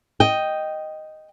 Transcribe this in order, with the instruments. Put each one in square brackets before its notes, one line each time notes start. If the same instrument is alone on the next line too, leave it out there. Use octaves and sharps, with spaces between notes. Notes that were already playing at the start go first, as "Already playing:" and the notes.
[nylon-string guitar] D#5 G5